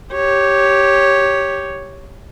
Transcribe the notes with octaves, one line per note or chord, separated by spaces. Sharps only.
G4 C#5